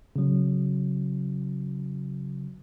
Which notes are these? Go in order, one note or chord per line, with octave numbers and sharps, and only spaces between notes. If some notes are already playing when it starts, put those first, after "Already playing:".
C#3 F#3